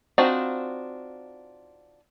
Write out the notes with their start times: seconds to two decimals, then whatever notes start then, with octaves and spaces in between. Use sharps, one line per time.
0.18 C4 D4 D#4 F4 F#4